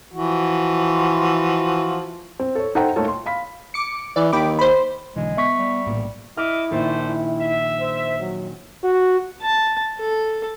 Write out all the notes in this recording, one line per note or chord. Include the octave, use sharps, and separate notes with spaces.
E3 F3 F#4
C4
A4 C#5
D#4 A4 C5 F#5 G5 A#5
A3 A#3 D#4 F4 A4 C#5
C6
F5 B5 B6
D6 C#7
E3 D5
D#2 G5 B5 D6
C5 B5
B1 D3 E3 G#3
B3 E5 C#6 B6
G3
A#1 A2 A#3
E4 D#5 E5 D6 F6
A#1 D#3 A3 D4 C5
E4
E5
C5
F#3
F#4
A5
A4